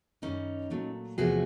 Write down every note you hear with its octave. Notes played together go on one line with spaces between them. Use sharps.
F#2 D#3 G3 C#4 D#4
A#2 F#3 A3
E2 C3 F3 A3 F#4 G#4